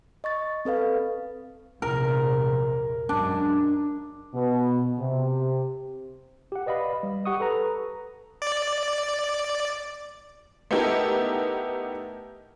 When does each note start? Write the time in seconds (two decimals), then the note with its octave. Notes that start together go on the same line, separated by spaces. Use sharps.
0.24 D#5 C#6 A6
0.65 C4 A4 B4 F5
1.82 A#1 E2 C3 A#4
3.09 F#2 F#3 G#3 D4
4.34 B2
4.99 C3
6.52 G4 F#5
6.66 B4 D5 D#5 F5 B5
7.03 G3
7.25 G4 F#5 C#6 D#6
7.40 A4 B4 A#5
8.42 D5
10.71 A3 B3 D#4 E4 G4 A#4